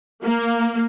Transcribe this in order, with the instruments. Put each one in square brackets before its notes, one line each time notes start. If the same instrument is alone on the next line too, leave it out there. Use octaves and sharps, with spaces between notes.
[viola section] A#3